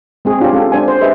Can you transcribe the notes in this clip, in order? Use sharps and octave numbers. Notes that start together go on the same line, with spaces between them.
G#3 C4 G#4
D4 F4 G4 C#5 F5 G#5
G#3 C#4 A4 F5
G#3 D4 C5 G#5
C5
G4 G#4 B4 D#5 E5